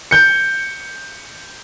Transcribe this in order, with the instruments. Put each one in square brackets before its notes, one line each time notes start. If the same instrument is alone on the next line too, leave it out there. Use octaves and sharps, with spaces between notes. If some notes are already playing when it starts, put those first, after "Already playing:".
[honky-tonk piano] G6 C#7